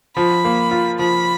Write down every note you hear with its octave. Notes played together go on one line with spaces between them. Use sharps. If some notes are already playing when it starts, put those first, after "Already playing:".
F3 B5
A#3
F4
F3 B5